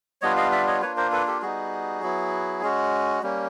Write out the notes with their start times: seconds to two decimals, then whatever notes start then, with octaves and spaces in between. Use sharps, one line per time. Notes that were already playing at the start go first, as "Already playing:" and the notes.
0.22 G3 B3 D4 F4 C#5 D#5
0.37 D#5 F5
0.52 D5 E5
0.67 C#5 D#5
0.82 A#3 D4 F4 B4 C#5
0.97 A#4 C5
1.12 A4 B4
1.27 G4 A4
1.42 G3 B3 D#4 F#4 G#4
2.02 F#3 B3 E4
2.62 G#3 C#4 F#4
3.22 G3 A#3 C#4